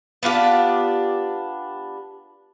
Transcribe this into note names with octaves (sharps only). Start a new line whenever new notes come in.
B3 D4 F4 G4